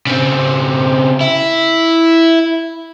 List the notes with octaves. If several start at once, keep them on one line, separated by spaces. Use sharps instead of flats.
C#3 C4
E4